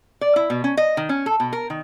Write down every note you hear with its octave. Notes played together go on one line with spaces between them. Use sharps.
D5
E4
B2
C#4
D#5
D#3
C#4
A4
B2
A#4
D#3